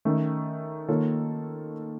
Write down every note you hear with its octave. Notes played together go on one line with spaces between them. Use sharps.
D#3 A3 C#4
D#3 A#3 F4 A4 C#5